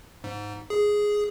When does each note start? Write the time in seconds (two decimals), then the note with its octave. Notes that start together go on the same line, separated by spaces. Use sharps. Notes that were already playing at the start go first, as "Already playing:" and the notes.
0.24 G#2
0.70 G#4